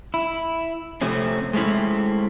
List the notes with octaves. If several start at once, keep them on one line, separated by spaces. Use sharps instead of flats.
E4
C3 F3 A3 C4 C#4
G#3 A3 C4 C#4 E4